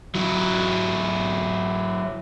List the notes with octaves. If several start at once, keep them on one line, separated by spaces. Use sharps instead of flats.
F#3 E4